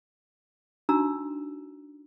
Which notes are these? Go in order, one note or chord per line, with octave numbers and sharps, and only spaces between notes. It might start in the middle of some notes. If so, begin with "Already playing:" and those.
D4 D#4 F#4 A#5 E6